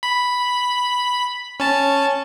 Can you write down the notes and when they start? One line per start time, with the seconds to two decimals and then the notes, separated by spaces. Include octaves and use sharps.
0.03 B5
1.60 C#4 A5